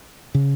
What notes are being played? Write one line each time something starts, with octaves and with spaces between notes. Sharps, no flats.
C#3